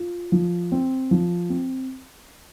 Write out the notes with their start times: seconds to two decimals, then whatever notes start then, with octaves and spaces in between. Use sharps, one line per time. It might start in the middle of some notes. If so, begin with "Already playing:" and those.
Already playing: F4
0.32 F3
0.72 C4
1.11 F3
1.50 C4